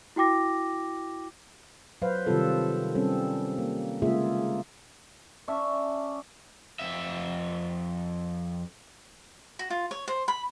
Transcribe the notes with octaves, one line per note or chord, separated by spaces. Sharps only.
E4 F#4 G5 D6 A#6
F#3 B4 C5 F5
C3 D#3 G3 C4 F4 A4
G3 C4 C#4 A4
A#3
C#3 G#3 A#3 F4 G#4 E5
C#4 D4 E5
F2 E5
F#4
F4
C#5
C5
B5